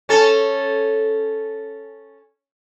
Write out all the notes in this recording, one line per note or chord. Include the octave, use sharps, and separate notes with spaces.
C#4 A4